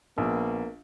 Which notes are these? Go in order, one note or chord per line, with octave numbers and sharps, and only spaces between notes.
A#1 A#3 B3